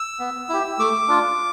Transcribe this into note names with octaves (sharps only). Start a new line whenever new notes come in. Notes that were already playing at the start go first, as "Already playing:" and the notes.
Already playing: E6
B3
E4 G4
A3 D6
D4 F4